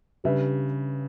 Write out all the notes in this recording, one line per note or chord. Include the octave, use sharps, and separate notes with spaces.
C#3 G3 D4 G4 B4 E5